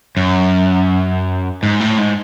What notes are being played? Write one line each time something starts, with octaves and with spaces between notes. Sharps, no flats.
F#2
G#2
A2
G#2